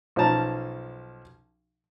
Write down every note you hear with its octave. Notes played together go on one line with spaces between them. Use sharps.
B1 F3 C#4 A5 A#5